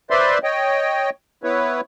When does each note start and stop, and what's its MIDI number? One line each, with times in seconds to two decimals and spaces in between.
0.10 0.38 71
0.10 0.38 72
0.10 0.38 74
0.10 0.38 76
0.10 0.38 84
0.44 1.10 73
0.44 1.10 75
0.44 1.10 79
1.44 1.81 59
1.44 1.81 64
1.44 1.81 71
1.44 1.81 73